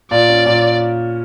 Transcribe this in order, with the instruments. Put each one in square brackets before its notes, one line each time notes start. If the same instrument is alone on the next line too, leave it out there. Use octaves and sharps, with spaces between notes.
[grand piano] A#2 [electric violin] D5
[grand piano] C#4
A#2